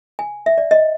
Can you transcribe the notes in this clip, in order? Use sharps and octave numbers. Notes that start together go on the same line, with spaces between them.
G#5
E5
D5
D#5